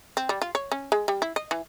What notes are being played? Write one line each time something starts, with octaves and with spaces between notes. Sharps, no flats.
C4
G3
F4
C#5
C#4
G#3
G3
E4
D#5
E3